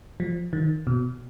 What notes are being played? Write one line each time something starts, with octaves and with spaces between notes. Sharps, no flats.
F3
D#3
B2